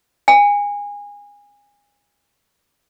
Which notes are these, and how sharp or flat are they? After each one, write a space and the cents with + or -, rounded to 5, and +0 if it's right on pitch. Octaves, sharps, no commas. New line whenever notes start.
G#5 -25